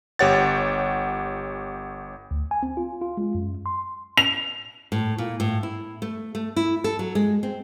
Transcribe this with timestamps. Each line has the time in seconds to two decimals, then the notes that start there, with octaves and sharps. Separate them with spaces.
0.19 G1 G4 C#5 F#5 A6
2.31 D2
2.51 G#5
2.63 C4
2.77 F4
3.01 F4
3.17 G#3
3.35 F#2
3.66 C6
4.17 F7
4.92 A2
5.18 A#2
5.40 A2
5.63 E4
6.02 A3
6.35 A3
6.56 E4
6.84 A4
6.99 F#3
7.15 G#3
7.43 C4